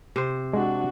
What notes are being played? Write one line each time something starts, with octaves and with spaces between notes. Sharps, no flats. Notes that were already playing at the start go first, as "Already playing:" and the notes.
C3 C5
G#3 D4 F#4